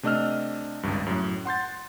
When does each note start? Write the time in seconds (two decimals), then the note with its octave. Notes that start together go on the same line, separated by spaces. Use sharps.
0.03 C3 A3 D4 D#5 E6 F6
0.83 G#1 C#2 G2
1.06 F#2 A2
1.45 F#5 C6 G6 A6